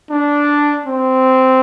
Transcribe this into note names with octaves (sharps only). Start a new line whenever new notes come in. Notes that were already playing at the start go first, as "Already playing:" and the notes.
D4
C4